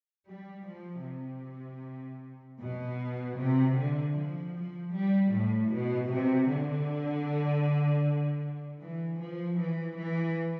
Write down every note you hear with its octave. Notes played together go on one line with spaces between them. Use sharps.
G3
F3
C3
B2
C3
D3
F3
F3
G3
A2
B2
C3
D3
E3
F3
E3
E3